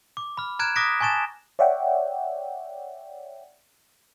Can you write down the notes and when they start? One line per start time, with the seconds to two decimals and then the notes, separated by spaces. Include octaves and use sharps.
0.17 D6
0.37 B5 F6
0.59 A#5 F6 F#6 G#6 D7 E7
0.76 D6 D#6 F#6 A#6 B6 D7
1.01 G#5 A5 C#6 A6 E7
1.59 C#5 D5 E5 F#5 G5